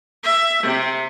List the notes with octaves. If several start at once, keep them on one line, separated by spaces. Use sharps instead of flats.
E5
C3